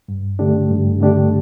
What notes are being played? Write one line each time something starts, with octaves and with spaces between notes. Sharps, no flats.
G2
D3 A3 D4 G4
G2
D3 A3 D4 G4